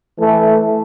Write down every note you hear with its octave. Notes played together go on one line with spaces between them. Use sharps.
E3 A3